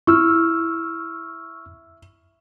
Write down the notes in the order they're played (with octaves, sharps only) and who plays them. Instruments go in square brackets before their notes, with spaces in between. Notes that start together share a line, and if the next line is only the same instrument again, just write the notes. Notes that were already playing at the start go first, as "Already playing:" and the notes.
[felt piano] E4 [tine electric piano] C#6 E6 F6